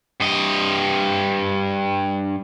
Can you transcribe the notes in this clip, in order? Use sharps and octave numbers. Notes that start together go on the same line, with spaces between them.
G2 D#5